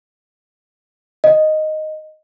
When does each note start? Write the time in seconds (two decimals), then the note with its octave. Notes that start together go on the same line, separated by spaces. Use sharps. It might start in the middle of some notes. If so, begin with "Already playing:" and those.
1.24 D#5